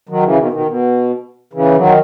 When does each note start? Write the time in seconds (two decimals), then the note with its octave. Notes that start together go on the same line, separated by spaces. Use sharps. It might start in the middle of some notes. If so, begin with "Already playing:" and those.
0.09 D#3 F#3
0.23 C#3 E3
0.38 B2 D#3
0.52 B2 D#3
0.66 B2
1.53 C#3 E3
1.76 D#3 F#3